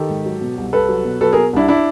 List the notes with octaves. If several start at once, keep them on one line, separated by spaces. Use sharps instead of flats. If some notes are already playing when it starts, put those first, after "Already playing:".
Already playing: D#3 G4 A4
G#2
F#3
B2
C2
C2 A4 B4
F#3
B2
F#3 A4 B4
B2 G#4 A#4
C2 D4 E4
D4 E4